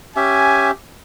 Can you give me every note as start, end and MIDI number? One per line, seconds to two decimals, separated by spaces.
0.16 0.71 61
0.16 0.71 67
0.16 0.71 76
0.16 0.70 80